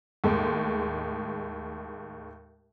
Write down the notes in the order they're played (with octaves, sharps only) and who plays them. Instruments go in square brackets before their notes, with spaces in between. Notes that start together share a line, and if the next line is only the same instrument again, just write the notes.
[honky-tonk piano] D#2 A2 G#3